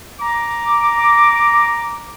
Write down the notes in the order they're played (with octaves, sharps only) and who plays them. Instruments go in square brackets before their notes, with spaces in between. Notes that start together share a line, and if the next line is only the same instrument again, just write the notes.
[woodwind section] A#5 D6